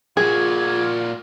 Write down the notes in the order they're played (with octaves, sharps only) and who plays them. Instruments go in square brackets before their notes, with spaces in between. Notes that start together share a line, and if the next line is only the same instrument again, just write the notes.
[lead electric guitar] A#2 F#4 [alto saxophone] F4 [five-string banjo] G#4 [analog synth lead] G#6